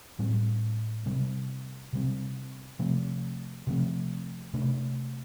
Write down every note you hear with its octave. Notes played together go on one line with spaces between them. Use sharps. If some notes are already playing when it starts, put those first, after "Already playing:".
A2 G3 C4
C3 G3 C4
C3 G3 C4
C3 F3 A3 C4
C3 F3 A3 C4
C3 A3 D4